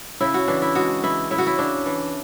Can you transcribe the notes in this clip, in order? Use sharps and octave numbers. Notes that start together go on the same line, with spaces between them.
C#3 E4
F#4
E3 D4
E4
G#3 F#4
E3 E4
C#3 E4
F#4
E4
C#3 D4
E3